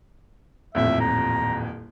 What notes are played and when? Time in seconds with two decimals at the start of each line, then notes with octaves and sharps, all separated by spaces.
0.75 D#1 A1 F2 E5
1.00 A#5